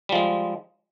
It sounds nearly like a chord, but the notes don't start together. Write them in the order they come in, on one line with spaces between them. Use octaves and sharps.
G3 F3 G#3